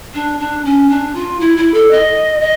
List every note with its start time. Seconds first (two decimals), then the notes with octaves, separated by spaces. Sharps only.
0.14 D4
0.39 D4
0.64 C#4
0.89 D4
1.15 F4
1.39 E4
1.56 E4
1.74 A4
1.90 D#5
2.41 D#5